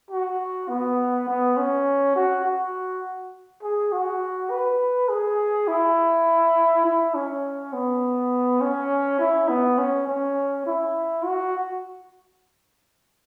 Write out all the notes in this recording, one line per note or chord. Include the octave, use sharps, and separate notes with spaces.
F#4
B3
B3
C#4
F#4
F#4
G#4
F#4
B4
G#4
E4
E4
C#4
B3
C#4
E4
B3
C#4
C#4
E4
F#4